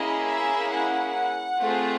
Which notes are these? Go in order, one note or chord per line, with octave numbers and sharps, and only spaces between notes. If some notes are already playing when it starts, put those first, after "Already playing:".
Already playing: A#3 C#4 E4 G#4 D#5
E5
F#5
A3 C4 F4 G#4